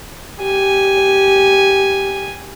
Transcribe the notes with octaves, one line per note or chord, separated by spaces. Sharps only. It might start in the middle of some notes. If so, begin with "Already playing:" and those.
G4 G#5